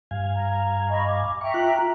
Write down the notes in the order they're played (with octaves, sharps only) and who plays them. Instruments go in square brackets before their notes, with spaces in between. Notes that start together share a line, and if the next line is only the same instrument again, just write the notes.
[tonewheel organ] G2 F5 G#5
[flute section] A#5
D#5 B5 C#6
D6
[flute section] E5 G5 A#5 [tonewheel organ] C#6
[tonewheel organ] F4 F#6